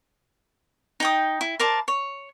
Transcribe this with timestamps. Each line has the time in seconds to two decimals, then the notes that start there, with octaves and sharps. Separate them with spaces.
1.00 D#4 G5 D#6
1.41 E4
1.59 A#4 C5 D5 A5
1.88 C#5